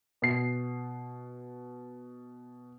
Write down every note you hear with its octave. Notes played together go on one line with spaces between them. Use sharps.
B2 C7